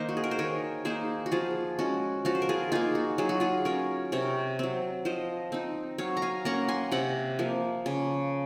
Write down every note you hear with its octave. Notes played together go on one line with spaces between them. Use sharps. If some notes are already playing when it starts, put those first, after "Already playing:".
Already playing: D#3 A#3 D#4 C5 D#5
F#4
G#4
A#4
C5
D#3 A#4 C#5
A#3 D#4 G#4 C5
F#4
F3 F4 G#4
G#3 C#4 F#4
F3 F#4
C5
A#4
F4 G#4
A#3 D#4 F4 G#4
F#4
F#3 G#4
F#4
F4 G#4
C#4 A#4 C#5
C3 A#4 C#5
F#3 C4
F3 C5 D#5
C4 D#4
F#3 C#5 F5
A#5
F5 G#5
A#3 C#4 F#5 A#5
G#5 C6
C3 F#5 A#5
F3 A#3
C#3